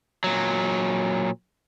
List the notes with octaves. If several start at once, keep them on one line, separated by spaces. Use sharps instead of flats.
A#2 F#3